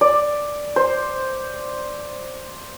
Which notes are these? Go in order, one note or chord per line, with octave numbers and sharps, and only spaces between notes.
D5
C5